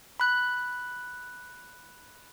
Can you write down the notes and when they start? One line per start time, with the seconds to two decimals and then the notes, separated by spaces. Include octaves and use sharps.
0.20 B5 F#6